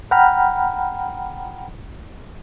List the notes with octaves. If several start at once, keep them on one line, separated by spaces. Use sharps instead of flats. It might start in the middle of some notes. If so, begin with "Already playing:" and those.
F#5 G5 A#5 B5 F6